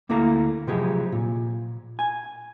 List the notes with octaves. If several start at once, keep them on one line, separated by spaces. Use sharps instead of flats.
D2 A#3 E4 A4 F5 A#5
C3 F3 F#3 G#3 G4 G#4
A#2
G#5